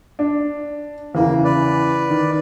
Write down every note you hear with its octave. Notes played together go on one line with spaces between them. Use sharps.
D4
E2 C#3 E3 A#3
B4 D5
D#3